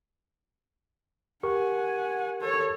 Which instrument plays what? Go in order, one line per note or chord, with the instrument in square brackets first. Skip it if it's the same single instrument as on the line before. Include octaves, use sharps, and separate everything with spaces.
[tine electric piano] G4 A#4 C#6 [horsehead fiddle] F#5 G#5
[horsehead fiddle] A4 C#5